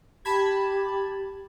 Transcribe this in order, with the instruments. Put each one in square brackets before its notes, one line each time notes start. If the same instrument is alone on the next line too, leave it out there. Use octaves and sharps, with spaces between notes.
[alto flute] G4 [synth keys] A5 B5 G#6